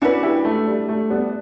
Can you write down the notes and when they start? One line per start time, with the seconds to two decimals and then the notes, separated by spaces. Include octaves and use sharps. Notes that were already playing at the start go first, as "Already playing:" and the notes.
0.01 C#4 D4 E4 F#4 B4
0.23 E4 G4
0.45 A3
0.67 G3
0.89 A3
1.10 G3 B3